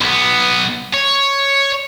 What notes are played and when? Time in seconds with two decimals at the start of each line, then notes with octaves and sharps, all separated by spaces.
0.01 B1 B3
0.94 C#5